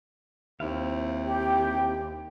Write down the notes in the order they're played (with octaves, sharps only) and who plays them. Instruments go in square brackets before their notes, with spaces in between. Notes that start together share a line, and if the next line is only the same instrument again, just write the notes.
[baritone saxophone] D#2 [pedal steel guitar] C4 E4 F5
[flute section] G4 G5